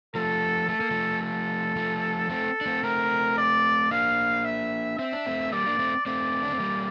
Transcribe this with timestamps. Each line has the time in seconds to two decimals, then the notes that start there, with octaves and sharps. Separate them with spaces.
0.15 F3 A3 A4
0.69 A3 A4
0.81 A#3
0.91 F3 A3
1.23 A4
1.76 F3 A3
2.30 A3 C4 A4
2.61 D4
2.66 A3 C4
2.83 A3 C4 A#4
3.38 D5
3.91 A#3 D4 F5
4.45 E5
4.99 C4 E5
5.12 D4
5.26 A3 C4
5.52 G3 A#3 D5
5.66 A#3 D4
5.79 A3 C4
6.06 A3 C4 D5
6.43 D4
6.52 C4
6.60 G3 A#3